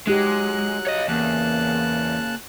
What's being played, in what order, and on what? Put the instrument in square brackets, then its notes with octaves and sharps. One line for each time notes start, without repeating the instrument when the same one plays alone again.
[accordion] F#3 F#6 [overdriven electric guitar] G#3 [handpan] D#4 G4
[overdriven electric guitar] C#5 D#5
[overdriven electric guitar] E2 [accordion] C#3 A5 F#6 [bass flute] A#3